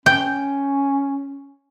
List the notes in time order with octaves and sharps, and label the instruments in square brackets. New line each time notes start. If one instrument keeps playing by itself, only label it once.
[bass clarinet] C#4 [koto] G5